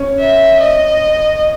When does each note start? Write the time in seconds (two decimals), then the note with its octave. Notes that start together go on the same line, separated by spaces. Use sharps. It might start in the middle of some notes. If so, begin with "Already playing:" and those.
Already playing: C#4
0.19 E5
0.60 D#5